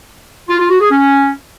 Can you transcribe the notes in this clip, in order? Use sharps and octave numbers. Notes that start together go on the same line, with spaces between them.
F4
F4
F#4
G#4
C#4